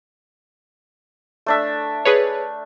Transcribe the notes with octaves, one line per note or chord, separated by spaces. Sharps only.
A3 D4 E5
G#4 B4 C#5